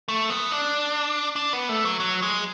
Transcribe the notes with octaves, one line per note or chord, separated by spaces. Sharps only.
A3
B3
D4
D4
B3
A3
F#3
F#3
G#3